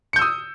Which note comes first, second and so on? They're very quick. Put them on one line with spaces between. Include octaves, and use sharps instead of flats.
C#7 G6 E6 D#6